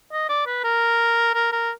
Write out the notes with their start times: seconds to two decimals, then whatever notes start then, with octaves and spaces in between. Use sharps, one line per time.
0.13 D#5
0.29 D5
0.46 B4
0.64 A#4
1.35 A#4
1.52 A#4